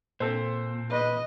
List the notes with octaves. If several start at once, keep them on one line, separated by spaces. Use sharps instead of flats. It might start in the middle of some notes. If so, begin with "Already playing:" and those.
A#2 C4 A4 C5
B4 D#5